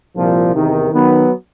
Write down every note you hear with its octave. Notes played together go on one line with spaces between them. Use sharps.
C2 A#2 F3
E2 C3 D#3
D#3 F#3 B3